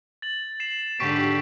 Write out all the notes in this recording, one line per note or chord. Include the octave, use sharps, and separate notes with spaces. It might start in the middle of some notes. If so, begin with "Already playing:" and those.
A6 F#7
C7 E7
G#2 D3 G4 C#6 B6 D7